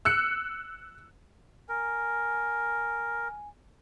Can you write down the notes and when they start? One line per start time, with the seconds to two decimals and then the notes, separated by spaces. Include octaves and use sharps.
0.05 E6 F#6 C#7
1.69 A#4 G#5